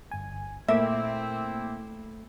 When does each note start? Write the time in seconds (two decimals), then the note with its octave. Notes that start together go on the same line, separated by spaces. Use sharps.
0.11 G1 G#5
0.69 A#2 A3 A#3 C4 E4 E5 D6